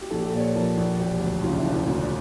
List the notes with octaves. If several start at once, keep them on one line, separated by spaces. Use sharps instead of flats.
G4
A#1 A4
G4
A4
A#2 D5
C#5
F3 A#4
A#1
E1 G4
D2
C#3 F4
D4
E4
E1 D4
E4
D2 F4
D4